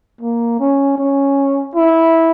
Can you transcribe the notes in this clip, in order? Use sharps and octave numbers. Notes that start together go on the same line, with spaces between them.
A#3
C#4
C#4
E4